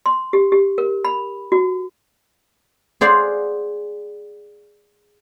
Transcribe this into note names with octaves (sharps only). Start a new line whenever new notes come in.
C6
G4
G4
A#4
B5
F#4
G#4 C5 D5 F5 F#5